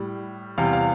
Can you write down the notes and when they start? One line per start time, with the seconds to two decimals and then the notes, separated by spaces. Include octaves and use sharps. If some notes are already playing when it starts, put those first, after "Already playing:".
Already playing: A2 G3
0.58 E2 C3 G3 F5
0.73 F5